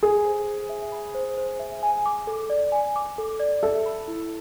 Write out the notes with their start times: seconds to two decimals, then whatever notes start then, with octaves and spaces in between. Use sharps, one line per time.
0.02 G#4 B5
0.24 C5
0.47 C5
0.69 E5
0.92 B5
1.14 C5
1.38 C5
1.60 E5
1.83 G#5
2.06 D6
2.27 A4
2.50 D5
2.72 G#5
2.96 D6
3.18 A4
3.40 D5
3.63 A4 E5
3.86 B5
4.08 E4